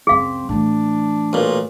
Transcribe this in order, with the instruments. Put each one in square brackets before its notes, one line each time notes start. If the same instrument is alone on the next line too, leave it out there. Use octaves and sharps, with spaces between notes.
[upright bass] C#2 F#2 [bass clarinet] C4 [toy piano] G#4 F5
[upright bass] A2 E3 [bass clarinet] D4
[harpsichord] B1 A#2